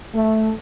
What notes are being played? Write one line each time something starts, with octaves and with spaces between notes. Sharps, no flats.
A3